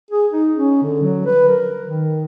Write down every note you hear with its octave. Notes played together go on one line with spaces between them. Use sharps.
G#4
D#4
C#4
D3
F#3
B4
A#4
D#3